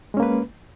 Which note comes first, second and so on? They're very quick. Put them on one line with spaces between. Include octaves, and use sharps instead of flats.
G#3 C#4 A#3 B4